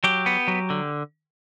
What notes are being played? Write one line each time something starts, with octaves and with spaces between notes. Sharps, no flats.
F#3 G4
B3
F#3
D3